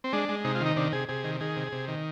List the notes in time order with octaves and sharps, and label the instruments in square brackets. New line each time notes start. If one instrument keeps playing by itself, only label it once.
[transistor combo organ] C4
G#3 D4
G#3
C3 D#4
F4
D#3
D#4
C3 D4
C3 G#4
C3 G#4
D#3
D#3 G#4
C3
C3
D#3